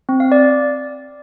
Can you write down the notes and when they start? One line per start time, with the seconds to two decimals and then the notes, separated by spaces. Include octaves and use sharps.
0.09 C4
0.20 F5
0.32 D5